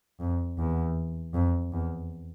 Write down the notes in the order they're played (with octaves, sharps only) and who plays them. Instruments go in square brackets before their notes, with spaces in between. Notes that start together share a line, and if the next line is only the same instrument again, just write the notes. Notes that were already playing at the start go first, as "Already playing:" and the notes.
[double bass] F2
E2
F2
E2